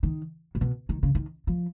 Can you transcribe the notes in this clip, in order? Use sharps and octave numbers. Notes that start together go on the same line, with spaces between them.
D#3
A#2
B2
D#3
C#3
D#3
F3